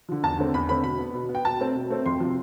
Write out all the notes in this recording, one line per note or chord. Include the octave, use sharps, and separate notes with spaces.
D3 F3
E2 A5
D3 A3 C4
E2 B5
D3 A3 C4 B5
B2 B5
B3
B2
B3
G5
B2 A5
A3 C4
B2
A3 C4
F2 C6
C3 F3